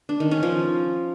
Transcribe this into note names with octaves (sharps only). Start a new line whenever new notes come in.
D4
D#3
C#4
F3